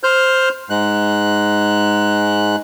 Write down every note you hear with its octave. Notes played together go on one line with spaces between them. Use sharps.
C5 F6 G6
G#2 G#3 F#6